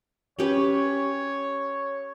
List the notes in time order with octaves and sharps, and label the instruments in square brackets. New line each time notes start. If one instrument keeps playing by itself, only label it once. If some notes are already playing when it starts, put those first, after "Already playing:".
[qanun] C#4 G4 B4 [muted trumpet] C#5